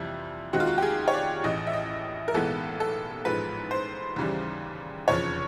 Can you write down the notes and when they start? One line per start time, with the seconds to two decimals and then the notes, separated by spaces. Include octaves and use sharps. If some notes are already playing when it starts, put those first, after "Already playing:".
Already playing: F2 C3 E3 G3 E4
0.53 D#2 D#3 G#3 C4 D#4 F#4
0.60 F4
0.67 F#4
0.78 G4
0.82 G#4
1.08 C#5
1.13 D5
1.44 A1 A2 E3 D#5
1.67 E5
1.73 D#5
2.28 A#4
2.34 B1 A2 E3 G#3 B3 A4
2.80 A4
3.25 A1 G#2 F3 G#3 B4
3.71 C5
4.16 D#2 C#3 E3 G3
5.08 F1 E2 C#3 F3 C#5